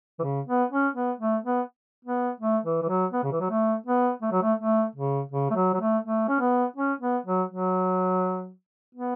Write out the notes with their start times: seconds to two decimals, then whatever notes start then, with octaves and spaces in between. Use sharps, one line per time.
0.19 E3
0.23 C#3
0.47 B3
0.71 C#4
0.95 B3
1.20 A3
1.45 B3
2.05 B3
2.41 A3
2.65 E3
2.82 E3
2.89 F#3
3.13 B3
3.23 C#3
3.32 E3
3.41 F#3
3.50 A3
3.86 B3
4.22 A3
4.32 F#3
4.42 A3
4.59 A3
4.95 C#3
5.32 C#3
5.50 A3
5.55 F#3
5.74 F#3
5.81 A3
6.04 A3
6.29 C#4
6.40 B3
6.76 C#4
7.01 B3
7.26 F#3
7.50 F#3
8.95 B3